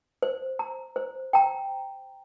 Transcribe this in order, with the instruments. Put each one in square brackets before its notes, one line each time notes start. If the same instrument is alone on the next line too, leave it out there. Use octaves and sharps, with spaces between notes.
[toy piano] C5
A#5
C5
G5 A#5